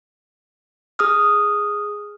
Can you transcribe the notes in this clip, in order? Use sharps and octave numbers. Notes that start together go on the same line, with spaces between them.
G#4 D#6 F6